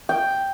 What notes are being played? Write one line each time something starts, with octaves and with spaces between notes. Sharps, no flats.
G5